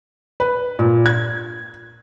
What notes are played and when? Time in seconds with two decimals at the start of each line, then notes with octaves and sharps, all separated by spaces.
0.40 B4
0.79 A#2
1.06 G#6